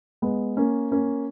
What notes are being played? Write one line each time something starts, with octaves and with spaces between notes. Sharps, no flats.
G#3 B3
A#3 C#4
A#3 C#4